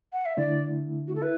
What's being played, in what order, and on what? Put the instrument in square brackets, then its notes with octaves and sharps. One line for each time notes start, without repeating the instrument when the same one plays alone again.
[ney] F#5
E5
[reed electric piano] D3 A3 E4 [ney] D5
[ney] F#4
A4
[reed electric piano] E4 [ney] B4